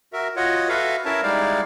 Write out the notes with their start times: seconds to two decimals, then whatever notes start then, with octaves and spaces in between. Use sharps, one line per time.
0.13 F#4 A#4 E5
0.36 F4 F#4 C#5 D#5 F#5
0.69 F#4 A4 B4 E5 F5
1.05 C#4 E4 A#4 C#5 E5 A5
1.23 G3 G#3 D#4 E4 D5 F5